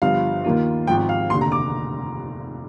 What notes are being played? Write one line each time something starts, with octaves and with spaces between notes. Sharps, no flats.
G1 G2 F3 F5
D#2 D#3 A#3 F4
G#1 G#2 F3 G5
F5
F1 D#2 D3 C6
A#5
D6